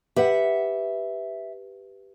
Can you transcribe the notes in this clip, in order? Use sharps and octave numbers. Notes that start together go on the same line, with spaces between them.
G4 B4 E5 F#5